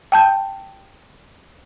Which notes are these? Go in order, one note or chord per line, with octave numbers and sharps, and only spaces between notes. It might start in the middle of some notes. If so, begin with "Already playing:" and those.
G5 A5 G6